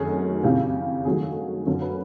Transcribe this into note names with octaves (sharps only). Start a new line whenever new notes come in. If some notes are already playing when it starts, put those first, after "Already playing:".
Already playing: F#2 D#3 F#3 A3 G#4
F2 C#3 E3 G4
G2 D#3 F#3 A3 G#4
F#2 D3 F#3 A#4
B4